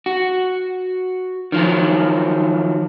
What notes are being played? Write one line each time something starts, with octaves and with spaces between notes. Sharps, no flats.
F#4
D#3 F3 F#3